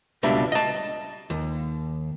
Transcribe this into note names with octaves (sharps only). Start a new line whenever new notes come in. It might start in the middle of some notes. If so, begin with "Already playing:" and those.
C#2 B2 G3 D4 E5
D#5 A5
D#2